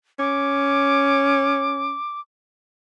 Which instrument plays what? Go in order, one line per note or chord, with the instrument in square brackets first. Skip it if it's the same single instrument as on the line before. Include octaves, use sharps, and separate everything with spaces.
[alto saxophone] C#4 [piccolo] D6